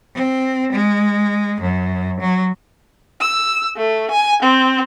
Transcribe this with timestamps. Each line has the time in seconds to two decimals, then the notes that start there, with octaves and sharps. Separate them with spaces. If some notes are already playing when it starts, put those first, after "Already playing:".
0.15 C4
0.72 G#3
1.61 F#2
2.20 F#3
3.21 E6
3.77 A3
4.11 G#5
4.43 C4